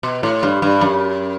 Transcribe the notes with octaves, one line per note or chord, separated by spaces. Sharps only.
B2
A2
G2
G2
F#2